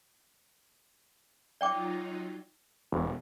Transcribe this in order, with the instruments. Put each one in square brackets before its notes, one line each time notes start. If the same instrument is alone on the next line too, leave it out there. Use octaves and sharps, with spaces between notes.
[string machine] F#3 D#4 F4 [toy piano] D5 G5 D6
[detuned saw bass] E1